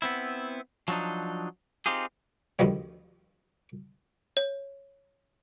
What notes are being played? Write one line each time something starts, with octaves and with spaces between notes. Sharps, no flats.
B3 C4 E4
F3 F#3 C4 D4 D#4
C4 D#4 F4 G4 G#4
D2 D#3 F3 G3
C#5